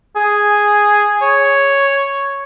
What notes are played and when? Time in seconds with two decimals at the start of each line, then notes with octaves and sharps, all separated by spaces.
0.16 G#4
1.22 C#5